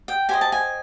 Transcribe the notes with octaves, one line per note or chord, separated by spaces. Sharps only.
G5
G4 C5 D#5 G#5
A5
G#5